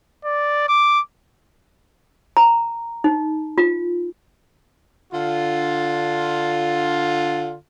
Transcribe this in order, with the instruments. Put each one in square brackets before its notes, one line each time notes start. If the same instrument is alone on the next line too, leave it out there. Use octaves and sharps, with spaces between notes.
[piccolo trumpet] D5
D6
[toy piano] A#5
D#4
F4
[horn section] D3 F4